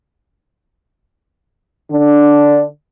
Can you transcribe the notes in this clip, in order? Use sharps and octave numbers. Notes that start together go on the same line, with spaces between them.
D3 D4